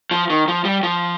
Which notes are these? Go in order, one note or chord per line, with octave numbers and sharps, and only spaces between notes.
F3
D#3
F3
G3
F3